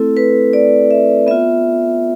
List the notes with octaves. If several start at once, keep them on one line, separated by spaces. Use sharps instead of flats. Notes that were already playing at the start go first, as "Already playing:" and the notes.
Already playing: A3 C4 E4 A4
B4
D5
E5
B3 F4 E5